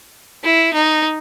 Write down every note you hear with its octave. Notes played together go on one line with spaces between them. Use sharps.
E4
D#4